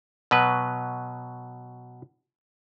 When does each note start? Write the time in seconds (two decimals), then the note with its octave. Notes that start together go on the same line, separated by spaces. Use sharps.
0.31 B2 F#3 B4